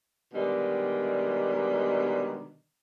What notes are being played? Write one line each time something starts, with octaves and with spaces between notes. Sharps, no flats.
B2 D3 D#3 G3 G#3